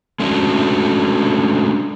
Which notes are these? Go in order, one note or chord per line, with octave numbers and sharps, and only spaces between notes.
G#3 A3 C#4 D4 F#4